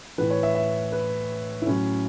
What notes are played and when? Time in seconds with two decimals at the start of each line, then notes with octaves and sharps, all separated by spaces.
0.18 A2 E3 B4
0.30 C#5
0.43 E5
0.55 E5
0.92 B4
1.62 E4
1.66 A2 F#3 C#4